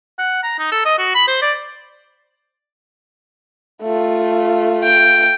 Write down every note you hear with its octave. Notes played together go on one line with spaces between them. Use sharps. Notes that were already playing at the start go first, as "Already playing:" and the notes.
F#5
A#5
D#4
A4
D#5
F#4
B5
C5
D5
A3 F4
G5